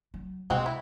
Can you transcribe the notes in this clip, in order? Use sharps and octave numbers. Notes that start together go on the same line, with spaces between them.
F#3
B2 G#3 C4 F#4
E4